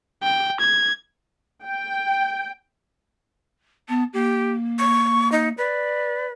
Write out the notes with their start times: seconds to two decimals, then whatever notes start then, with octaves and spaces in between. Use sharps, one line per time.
0.23 G5
0.60 G#6
1.65 G5
3.89 B3 A5
4.14 A#3 G4
4.79 C#6
5.32 D#4
5.58 B4 D5